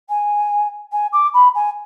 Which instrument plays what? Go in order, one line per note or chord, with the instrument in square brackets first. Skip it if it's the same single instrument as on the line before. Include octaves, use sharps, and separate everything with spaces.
[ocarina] G#5
G#5
D6
B5
G#5